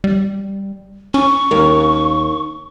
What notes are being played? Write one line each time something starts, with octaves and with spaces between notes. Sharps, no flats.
G3
C#4 C#6
D#2 A#4